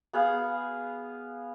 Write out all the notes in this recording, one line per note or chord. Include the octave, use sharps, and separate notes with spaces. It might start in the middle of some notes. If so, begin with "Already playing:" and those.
B3 G#4 F5